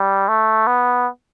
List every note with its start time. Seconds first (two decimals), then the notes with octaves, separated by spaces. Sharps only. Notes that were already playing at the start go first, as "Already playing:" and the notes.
Already playing: G3
0.28 A3
0.67 B3